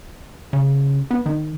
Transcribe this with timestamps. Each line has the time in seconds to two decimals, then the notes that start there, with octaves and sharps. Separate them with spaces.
0.53 C#3
1.11 B3
1.26 D#3